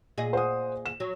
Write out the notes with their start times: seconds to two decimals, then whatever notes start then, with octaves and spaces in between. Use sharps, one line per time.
0.17 A#2 G#4 D#5
0.33 C5 F#5 D#6
0.86 E7
1.00 F#3